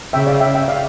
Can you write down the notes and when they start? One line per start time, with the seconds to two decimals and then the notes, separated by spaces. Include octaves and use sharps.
0.13 C#3 E5 G5
0.27 D5 F5
0.40 E5 G5
0.55 E5 G5
0.68 D5 F5